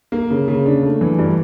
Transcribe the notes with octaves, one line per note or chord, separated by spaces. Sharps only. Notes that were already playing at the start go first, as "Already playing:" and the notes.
A#3
C#3
C#3
D4
A3
E3
G2